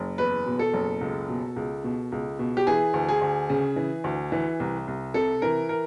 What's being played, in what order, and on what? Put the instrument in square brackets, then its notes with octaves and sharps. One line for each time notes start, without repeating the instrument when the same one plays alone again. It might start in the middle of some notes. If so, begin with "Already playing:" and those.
Already playing: [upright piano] F#1
E2 B4
B2
A4
F#1
C#2
B2
C#2
B2
C#2
B2
G4
E3 G#4
D2
G#4
D2
C#3
E3
D2
E3
C2
C2
C3 A4
E3 A#4
A#4